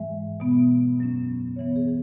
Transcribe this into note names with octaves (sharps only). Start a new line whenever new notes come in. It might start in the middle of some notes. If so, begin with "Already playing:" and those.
Already playing: G#2 E3 G#3 E5
B2 B3
F#2 F#3 C#4
C#3 E3 B3 C#5
G#4